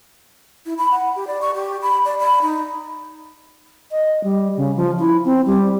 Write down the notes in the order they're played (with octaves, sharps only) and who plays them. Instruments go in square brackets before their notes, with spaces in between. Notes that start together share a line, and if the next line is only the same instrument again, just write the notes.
[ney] E4
B5
F#5
G4
D5
C#6
G4
B5
D5
B5
D#4
[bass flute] D#5
G3
C#3
F3
E4
C4
G3